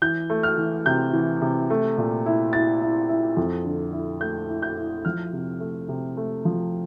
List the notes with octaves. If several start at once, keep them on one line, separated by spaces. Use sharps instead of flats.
E3 G6
A3
F6
E3
C3 G6
E3
C3
A3
A#2
E4
E4 A6
E4
E4
F2
D3
E4
A3 G6
E4
G6
E4
F3 F6
C3
A3
C3
A3
F3